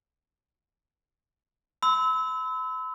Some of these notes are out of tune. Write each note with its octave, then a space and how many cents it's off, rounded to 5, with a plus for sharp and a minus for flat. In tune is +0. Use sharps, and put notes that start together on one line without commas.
B5 +45 E6 -25